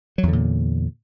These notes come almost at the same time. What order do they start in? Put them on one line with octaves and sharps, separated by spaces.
F#3 E2 D3 A#2